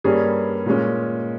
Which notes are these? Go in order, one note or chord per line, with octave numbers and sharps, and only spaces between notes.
G2 G3 A#3 C#4 G#4
A#2 G#3 C#4